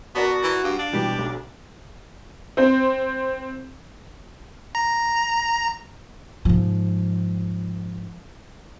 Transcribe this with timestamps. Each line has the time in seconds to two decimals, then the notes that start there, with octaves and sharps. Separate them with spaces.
0.15 B3 F#4 A#4 D5 A5
0.43 E3
0.64 G2 F5
0.79 D4
0.93 B2 E3 G3 G4
1.19 B1
2.57 C4 C5
4.75 A#5
6.45 G#2 F3